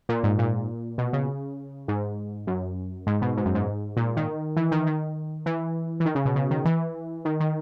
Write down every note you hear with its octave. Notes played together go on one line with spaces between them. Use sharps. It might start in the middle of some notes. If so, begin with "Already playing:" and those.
A#2
G#2
A#2
B2
C#3
G#2
F#2
G#2
B2
G#2
F#2
G#2
A#2
D#3
E3
D#3
D#3
E3
E3
D#3
C#3
B2
C#3
D#3
E3
D#3
D#3